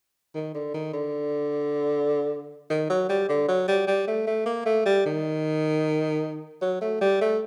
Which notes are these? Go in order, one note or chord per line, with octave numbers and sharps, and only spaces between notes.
D#3
D3
D#3
D3
D#3
F#3
G3
D3
F#3
G3
G3
A3
A3
A#3
A3
G3
D#3
F#3
A3
G3
A3